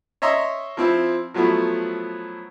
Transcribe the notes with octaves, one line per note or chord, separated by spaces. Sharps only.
C#5 D#5 E5 A#5 C6
F3 C4 E4
F3 F#3 A3 B3 E4